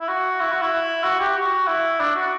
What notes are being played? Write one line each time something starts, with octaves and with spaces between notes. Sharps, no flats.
E4
F#4
E4
F#4
E4
F#4
G4
F#4
E4
D4
F#4